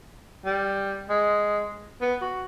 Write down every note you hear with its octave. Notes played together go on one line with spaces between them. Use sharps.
G3
G#3
B3
F#4